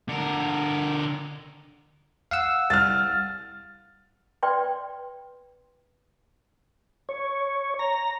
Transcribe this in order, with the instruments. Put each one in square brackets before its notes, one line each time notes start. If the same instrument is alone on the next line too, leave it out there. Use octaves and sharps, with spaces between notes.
[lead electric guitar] D3 A#4
[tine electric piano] F5 F#5 E6
[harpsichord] C2 [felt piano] F6 A6
[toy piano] B4 D5 G5 C6
[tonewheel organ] C#5
A#5